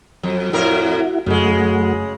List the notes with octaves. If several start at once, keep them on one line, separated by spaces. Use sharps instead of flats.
F2 F#3
F2 A2 E4 F#4 A#4
F#2 C#3 G#3 A3 F#4